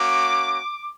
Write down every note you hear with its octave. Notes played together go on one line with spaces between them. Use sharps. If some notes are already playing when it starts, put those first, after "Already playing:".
Already playing: A#3 C#4 F#4 D6